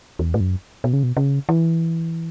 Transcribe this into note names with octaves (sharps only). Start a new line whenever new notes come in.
E2
A2
F#2
B2
C#3
B2
C#3
E3